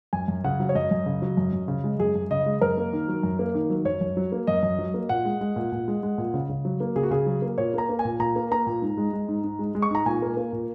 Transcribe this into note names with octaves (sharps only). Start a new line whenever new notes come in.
F#2 G#5
F#2
C#3 F#5
F#3
C#5
F#2 D#5
F#2
C#3
F#3
F#2
F#2
C#3
G#3
F#2 G#4
F#2
C#3 D#5
G#3
F#2 A#4
A#3
D#3
F#3
F#2
A#3
D#3
F#3
F#2 C#5
F#2
F#3
A#3
F#2 D#5
F#2
F#3
A#3
A#2 F#5
G#3
G#3
A#2
A#2
G#3
G#3
A#2
C#3
C#3
F#3
A#3
C#3 G#4
F#4
C#3 G#4
F#3
A#3
A#2 C#5
A#3 A#5
A#3
G#5
A#2
A#2 A#5
A#3
A#3 A#5
A#2
G#2
G#3
G#3
G#2
G#2
G#3
G#3
C#6
G#2 A#5
A#2 G#5
A#3
A#3
A#2